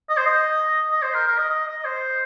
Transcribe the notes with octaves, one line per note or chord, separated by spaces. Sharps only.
D#5
C5
D#5
D#5
C5
A#4
A#4
D#5
D#5
D#5
C5